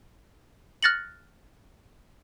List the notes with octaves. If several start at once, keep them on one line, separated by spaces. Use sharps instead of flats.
F6 F#6 A6 A#6 C#7 F#7